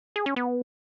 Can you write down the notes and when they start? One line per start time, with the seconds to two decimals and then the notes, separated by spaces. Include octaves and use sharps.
0.16 G#4
0.26 C#4
0.36 B3